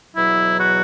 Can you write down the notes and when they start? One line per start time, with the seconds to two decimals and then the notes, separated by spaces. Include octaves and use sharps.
0.15 E2 B2 F#3 E4
0.60 F#4